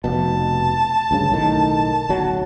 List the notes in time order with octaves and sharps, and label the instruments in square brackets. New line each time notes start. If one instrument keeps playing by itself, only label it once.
[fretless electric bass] F1 B2 [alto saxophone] A5
[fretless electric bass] D2 G2 C#3
B1 A2 D#3
D1 B1 F#3